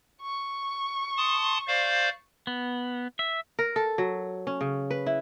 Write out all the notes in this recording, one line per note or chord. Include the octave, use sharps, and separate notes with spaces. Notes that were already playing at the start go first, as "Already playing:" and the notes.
C#6
A5 C6 D#6
C5 D5 F5
B3
E5
A#4
A4
F#3
C#4
C#3
B4
E4